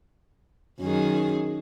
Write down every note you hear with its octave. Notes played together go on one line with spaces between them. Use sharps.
F#2 D#3 G#4